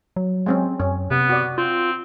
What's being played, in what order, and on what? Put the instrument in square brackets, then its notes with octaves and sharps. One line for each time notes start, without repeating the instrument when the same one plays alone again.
[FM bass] F#3
[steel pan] G#3 C4 C#4
[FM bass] F#2 [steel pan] C#4
[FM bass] C3 [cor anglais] B3
[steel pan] F#4 D5
[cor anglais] C4 [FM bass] F4